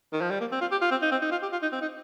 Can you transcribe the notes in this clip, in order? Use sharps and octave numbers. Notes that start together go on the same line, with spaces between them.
D#3
F3
G3
A#3
C4
F4
G4
F4
C4
D#4
C4
D#4
F4
G4
F4
D#4
C4
D#4